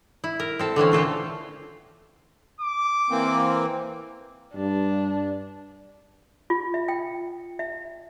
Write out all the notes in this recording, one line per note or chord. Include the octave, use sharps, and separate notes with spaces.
E4
A#4
C4 A4
D3 E3 C4 C#4
A#2 F4 A4 G5
D6
E3 A#3 C4
G2 D4
F4
E5
G5
E5